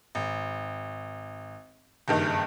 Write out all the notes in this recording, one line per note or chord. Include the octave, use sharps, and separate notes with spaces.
G#1
F#1 G2 D#3